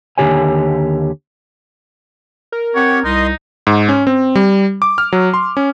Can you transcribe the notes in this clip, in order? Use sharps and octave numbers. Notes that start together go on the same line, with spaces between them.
D#2 G#2 D3 G4 C#5 G#5
A#4
C4 G4 C#5 F#5
C2 D#4 D#5 C6
G#2
C#4
C4
G3
D6
F6
F#3
C6
C#4